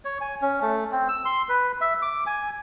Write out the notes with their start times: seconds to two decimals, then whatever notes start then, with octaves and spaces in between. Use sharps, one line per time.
0.05 C#5
0.21 G#5
0.41 C#4
0.62 A3
0.92 C4
1.08 E6
1.25 C6
1.49 B4
1.81 E5
2.02 D6
2.26 G#5